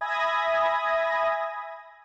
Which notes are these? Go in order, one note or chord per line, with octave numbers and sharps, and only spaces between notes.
E5 G#5 B5 D#6 G#6 A#6